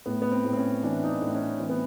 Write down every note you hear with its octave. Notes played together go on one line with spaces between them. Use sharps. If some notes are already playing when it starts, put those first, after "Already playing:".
A2 B3
B3
C4
A2
C4
C#4
E3 D4
D#4
D4
A2
C#4
E3 C4
B3